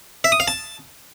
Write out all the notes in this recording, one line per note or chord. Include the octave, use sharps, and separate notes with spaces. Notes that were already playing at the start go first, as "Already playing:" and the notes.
E5
D#6
F5
A5